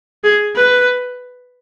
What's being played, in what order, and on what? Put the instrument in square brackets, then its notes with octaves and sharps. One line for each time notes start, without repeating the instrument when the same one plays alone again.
[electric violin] G#4
B4